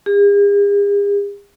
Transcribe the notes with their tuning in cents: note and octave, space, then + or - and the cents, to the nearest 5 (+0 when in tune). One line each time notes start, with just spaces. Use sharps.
G#4 -45